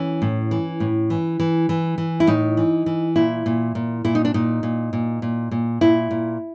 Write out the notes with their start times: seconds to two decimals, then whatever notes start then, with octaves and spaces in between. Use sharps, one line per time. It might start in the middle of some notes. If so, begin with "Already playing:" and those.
Already playing: E3 C#4
0.22 A2
0.51 E3
0.80 A2
1.10 E3
1.40 E3
1.69 E3
1.98 E3
2.20 E4
2.27 A2 D#4
2.57 E3
2.86 E3
3.16 A#2 E4
3.46 A#2
3.75 A#2
4.04 A#2 E4
4.15 D#4
4.25 D4
4.34 A#2 D#4
4.63 A#2
4.93 A#2
5.22 A#2
5.51 A#2
5.81 A#2 E4
6.11 A#2